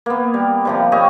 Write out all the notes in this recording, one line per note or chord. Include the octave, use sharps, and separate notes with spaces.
A#3 B3
G3
C3 F3 G3
A#3 G4 C#5 D#5